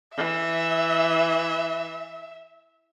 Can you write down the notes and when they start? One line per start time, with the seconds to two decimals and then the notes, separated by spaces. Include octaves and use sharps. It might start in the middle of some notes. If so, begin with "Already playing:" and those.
0.17 E3 E5